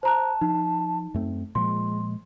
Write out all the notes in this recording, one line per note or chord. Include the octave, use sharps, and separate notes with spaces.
C5 A5 A#5 F#6
F3 D#4
F#2 A3 C4
A#2 F3 G#3 C6